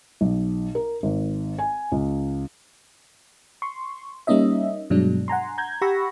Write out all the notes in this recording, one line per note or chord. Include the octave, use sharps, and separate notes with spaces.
B1
A#4
G#1
G#5
C#2
C6 C#6
G3 A#3 C#4 D#4 D#5 E5
G2 B2 F#3 G#3 D4
F#5 G#5 A#5 C6
A#5 G6 G#6
G4 F#5 B5 C#6 E6 A#6